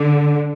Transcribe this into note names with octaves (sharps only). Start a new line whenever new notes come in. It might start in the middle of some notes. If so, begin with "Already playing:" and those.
Already playing: D3